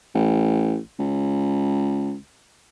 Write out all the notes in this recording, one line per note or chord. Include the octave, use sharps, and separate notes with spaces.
A1
C#2